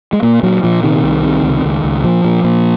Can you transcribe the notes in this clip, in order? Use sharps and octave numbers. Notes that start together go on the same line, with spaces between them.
G#3
A#2 A#3
A#2 F#3
A#2 F3
C3 D#3
C2
C3
C#2
C#2
C#2
A#2 F3
A#2
A#2